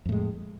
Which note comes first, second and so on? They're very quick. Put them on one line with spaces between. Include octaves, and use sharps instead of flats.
F2 A2 G#3